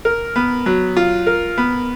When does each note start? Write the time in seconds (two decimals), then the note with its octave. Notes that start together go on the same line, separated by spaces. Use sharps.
0.05 A#4
0.36 B3
0.66 F#3
0.97 F4
1.27 A#4
1.58 B3